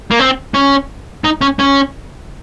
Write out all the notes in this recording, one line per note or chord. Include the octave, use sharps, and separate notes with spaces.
A#3
C4
C#4
D#4
C#4
C#4